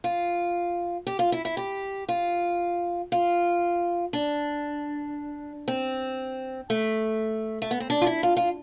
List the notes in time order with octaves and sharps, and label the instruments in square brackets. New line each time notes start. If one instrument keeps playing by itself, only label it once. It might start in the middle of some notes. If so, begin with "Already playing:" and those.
[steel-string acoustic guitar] F4
G4
F4
E4
E4
G4
F4
F4
D4
C4
A3
A3
B3
C4
D4
F4
E4
F4
F4